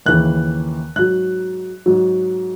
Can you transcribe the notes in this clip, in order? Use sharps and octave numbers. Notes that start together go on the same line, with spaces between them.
D#2 C#3 E3 F#6
G#2 F#3 F#6
G#2 F#3